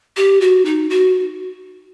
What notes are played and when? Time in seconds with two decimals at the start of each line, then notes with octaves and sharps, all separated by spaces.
0.17 G4
0.41 F#4
0.65 D#4
0.90 F#4